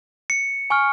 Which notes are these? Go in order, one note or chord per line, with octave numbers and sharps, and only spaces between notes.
C#7
G#5 C#6 F6